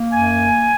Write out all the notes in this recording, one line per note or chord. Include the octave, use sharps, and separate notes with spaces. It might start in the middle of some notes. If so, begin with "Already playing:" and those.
Already playing: A#3
F#2 G#5